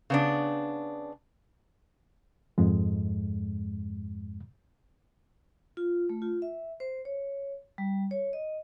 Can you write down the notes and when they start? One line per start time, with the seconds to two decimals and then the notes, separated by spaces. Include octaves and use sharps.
0.10 C#3 B3 D4
2.58 F2 G#2 G#3
5.77 F4
6.09 A3
6.22 F4
6.42 E5
6.80 C5
7.05 C#5
7.78 G3
8.11 C#5
8.33 D#5